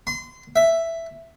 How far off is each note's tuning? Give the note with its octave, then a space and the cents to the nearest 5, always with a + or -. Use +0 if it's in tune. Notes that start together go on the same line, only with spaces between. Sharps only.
C6 -30
E5 +5